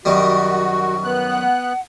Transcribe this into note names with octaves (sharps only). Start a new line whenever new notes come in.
F#2 D#3 G3 F#4 C#6
B3 F#6
F#5